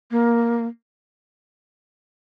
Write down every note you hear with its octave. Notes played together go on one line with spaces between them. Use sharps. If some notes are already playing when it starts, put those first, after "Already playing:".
A#3